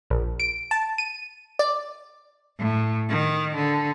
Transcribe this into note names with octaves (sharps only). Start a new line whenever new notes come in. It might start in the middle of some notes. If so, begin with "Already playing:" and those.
A#1
D7
A5
D#7
D5
A2
D#3
D3